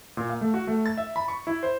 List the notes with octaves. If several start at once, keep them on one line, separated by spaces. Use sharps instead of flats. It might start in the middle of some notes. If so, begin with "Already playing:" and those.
A#2
F5
A3
F#4
A3
A6
E5
B5
C#6
E4
C5